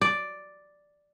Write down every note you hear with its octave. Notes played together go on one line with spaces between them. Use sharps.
D5